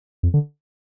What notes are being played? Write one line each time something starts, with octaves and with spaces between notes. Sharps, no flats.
F2
D3